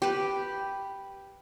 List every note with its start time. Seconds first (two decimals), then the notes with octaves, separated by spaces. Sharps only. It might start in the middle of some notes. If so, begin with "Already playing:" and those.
0.02 G4 B4